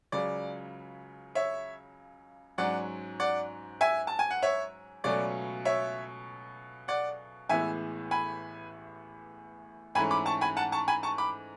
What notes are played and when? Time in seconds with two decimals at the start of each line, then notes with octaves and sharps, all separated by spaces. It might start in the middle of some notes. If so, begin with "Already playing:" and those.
0.12 C#2 C#3 F#3 D5
1.35 C#5 E5
2.58 G#2 F#3 C#4 D5 F#5
3.20 D5 F#5
3.81 E5 G#5
4.07 A5
4.19 G#5
4.31 F#5
4.42 C#5 E5
5.04 C#2 B2 F#3 A3 C#4 D5
5.65 C#5 E5
6.88 D5 F#5
7.49 A1 A2 E3 G#3 B3 E5 G#5
8.11 G#5 B5
9.95 G#2 E3 A3 C#4 G#5 B5
10.11 B5 D6
10.26 A5 C#6
10.41 G#5 B5
10.57 F#5 A5
10.72 A5 C#6
10.88 G#5 B5
11.03 A5 C#6
11.18 B5 D6